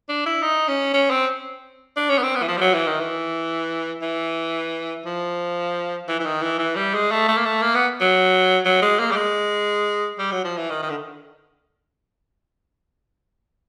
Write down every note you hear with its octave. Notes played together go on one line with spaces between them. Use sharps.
D4
E4
D#4
C#4
C#4
C4
D4
C#4
B3
C4
B3
E3
F3
G3
F#3
E3
D#3
E3
E3
F3
E3
E3
D#3
E3
E3
G3
G#3
A3
A3
A#3
A3
A#3
B3
F#3
F#3
G#3
A#3
G3
G#3
G3
F#3
F3
E3
D#3
D#3
D3